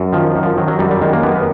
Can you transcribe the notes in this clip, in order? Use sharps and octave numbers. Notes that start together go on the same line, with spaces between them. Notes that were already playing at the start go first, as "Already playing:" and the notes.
Already playing: F#2
D#3 F3
F#2
F3
D#3 F#3
F#3
F#2 G3
G3
D#3 G#3
A#3
F#2 B3
B3